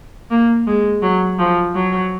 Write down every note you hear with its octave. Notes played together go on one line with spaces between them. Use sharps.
A#3
G#3
F#3
F3
F#3